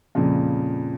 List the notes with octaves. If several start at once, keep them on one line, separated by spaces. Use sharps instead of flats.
F2 A#2 C#3